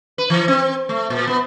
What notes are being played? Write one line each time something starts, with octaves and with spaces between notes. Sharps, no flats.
B4
E3
C4
A3
A#2
B3